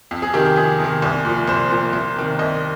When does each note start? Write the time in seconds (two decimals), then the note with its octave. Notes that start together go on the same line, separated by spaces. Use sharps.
0.11 F2
0.22 G#4
0.34 C3 D#3 G4
0.46 G4
0.56 F2 G#4
0.79 C3 D#3
1.02 C2
1.25 A#2 F3
1.48 C2 C5
1.70 A#2 F3
1.93 C2
2.16 C3 D#3
2.39 C2 D#5